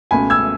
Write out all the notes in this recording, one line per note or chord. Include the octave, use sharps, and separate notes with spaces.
C#2 B2 A3 G#5 B5
E6 G#6